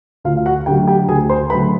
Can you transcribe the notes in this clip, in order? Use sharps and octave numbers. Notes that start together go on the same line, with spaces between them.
D2 F4 F5
F5
F#4 F#5
D3 F#3 A3 G4 G5
G4 G5
D2 G#4 G#5
C5 C6
D3 F#3 A3 B4 B5